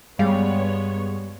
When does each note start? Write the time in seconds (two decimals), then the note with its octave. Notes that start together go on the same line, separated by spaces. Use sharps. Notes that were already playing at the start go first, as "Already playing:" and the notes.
0.19 G2 G3 G#3 B3 C#5 F5